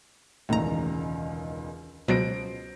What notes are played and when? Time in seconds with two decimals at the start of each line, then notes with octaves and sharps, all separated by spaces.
0.49 E1 C#2 A2 D#3 A#5
2.08 C#2 B2 F#3 C5 A#6 D7